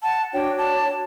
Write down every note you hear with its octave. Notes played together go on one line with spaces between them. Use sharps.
F#5 A5
D4 F#4 C#5 G5
A5